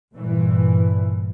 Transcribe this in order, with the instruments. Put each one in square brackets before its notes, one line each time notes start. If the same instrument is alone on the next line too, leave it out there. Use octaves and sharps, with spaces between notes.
[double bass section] G2 A#2 E3